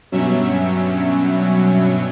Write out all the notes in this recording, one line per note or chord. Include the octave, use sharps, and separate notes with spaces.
G2 B2 F#3 C#4 E5